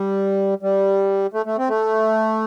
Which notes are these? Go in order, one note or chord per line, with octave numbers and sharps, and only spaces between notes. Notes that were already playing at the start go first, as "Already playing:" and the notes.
Already playing: G3
G3
A3
A3
C4
A3